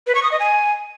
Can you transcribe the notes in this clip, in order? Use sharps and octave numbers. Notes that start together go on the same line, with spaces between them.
B4
C#6
D#6
D#5
G#5